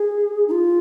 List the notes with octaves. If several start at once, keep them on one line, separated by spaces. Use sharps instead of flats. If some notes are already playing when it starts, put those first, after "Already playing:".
Already playing: G#4
D#4
F4